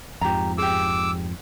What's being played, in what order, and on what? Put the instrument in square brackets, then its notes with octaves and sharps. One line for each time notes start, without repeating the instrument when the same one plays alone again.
[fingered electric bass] F2 G#2 F3 [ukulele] G4 A#5
[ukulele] G4 G#4 [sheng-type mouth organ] D6 E6